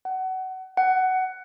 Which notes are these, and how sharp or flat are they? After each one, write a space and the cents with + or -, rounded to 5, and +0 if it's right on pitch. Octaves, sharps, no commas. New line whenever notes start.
F#5 +25
F#5 +15